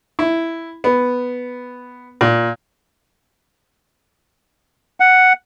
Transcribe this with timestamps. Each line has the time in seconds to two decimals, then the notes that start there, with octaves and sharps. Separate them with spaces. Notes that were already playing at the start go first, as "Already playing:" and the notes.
0.19 E4
0.84 B3
2.21 A#2
5.00 F#5